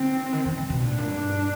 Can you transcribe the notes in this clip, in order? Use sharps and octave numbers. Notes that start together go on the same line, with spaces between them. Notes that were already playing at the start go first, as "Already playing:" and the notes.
Already playing: D3 C4
D#3
D#3
C#3
B2
A#2 D4
A2
A#2
G2